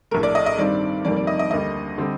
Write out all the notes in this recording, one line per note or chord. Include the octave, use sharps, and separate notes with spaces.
A#1 A2 A3 A#4
D5
D#5
D#5
G2 D#3 G3 C4 D5
F1 F2 D#3 G3 A#3 D5
D5
D#5
D#5
D2 D3 G3 A#3 D#5
D3 G3 C4